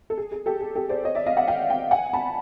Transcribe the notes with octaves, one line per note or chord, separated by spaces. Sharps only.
A4
G#4
G#4
G4 A4
G#4
G4 A4
C5 D5
C#5 D#5
D5 E5
D#5 F5
E5 F#5
F5 G5
F5 G5
F#5 G#5
A5 B5